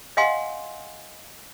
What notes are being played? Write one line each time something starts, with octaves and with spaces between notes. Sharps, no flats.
D#5 F5 F#5 G#5 C6